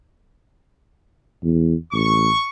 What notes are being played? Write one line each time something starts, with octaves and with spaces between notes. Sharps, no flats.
E2
A1 C#6